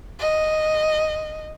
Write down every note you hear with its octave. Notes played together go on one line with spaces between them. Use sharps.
D#5